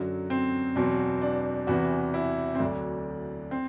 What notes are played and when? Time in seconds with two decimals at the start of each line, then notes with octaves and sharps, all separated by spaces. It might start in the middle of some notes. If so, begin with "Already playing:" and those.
Already playing: F#2 D3 F#3
0.30 C4
0.75 E2 B2 F#3 C4
1.22 D4
1.67 E2 C3 E3 F#4
2.14 E4
2.55 C4
2.59 D2 D3 F#3 D4
3.51 C4